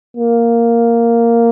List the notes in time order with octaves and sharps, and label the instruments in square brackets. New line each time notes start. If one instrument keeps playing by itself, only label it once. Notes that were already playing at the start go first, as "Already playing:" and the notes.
[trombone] A#3